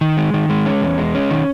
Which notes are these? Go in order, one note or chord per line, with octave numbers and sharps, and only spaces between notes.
D#3
G#3
D#3
G#3
C#4
E2
G#3
C#4
D#3